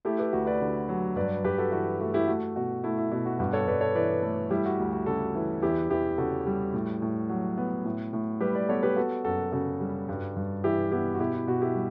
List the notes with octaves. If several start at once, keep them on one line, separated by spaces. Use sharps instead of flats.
A3 E4 G4
G4 B4
D2 F#4
B4 D5
D3
F#3
G2 B4 D5
G2 G4 B4
F#4 A4
E3 F#4
A3 F#4
E4 G4
A3 F#4
B2 F#4
A3 E4
E4
B2 E4
F#4
G2 F#4
A4 C#5
G2 B4 D5
A4 C#5
E3 B4 D5
A3
G3 E4 G4
F#4
D2
F#4
C#3 F#4 A4
E3
E2 E4 G4
E2 E4 G4
C#3 F#4 A4
G3
A2
A2
F#3
B3
A2
A2
G3 G4 B4
B4 D5
B3 A4 C#5
G4 B4
B3 F#4 A4
F#2 F#4 A4
C#3 F#4 A4
G3
G2
G2
E3 E4 G4
B3 E4 G4
F#4
B2 E4 G4
E4
B2 F#4
E4 G4
G3